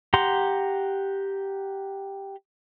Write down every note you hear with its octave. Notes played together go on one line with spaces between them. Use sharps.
G4 F#5 A#5 C6